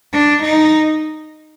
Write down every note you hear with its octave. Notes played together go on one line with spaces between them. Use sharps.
D4
D#4